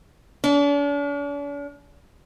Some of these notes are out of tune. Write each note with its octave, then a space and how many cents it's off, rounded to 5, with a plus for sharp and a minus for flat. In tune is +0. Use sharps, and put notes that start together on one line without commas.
D4 -45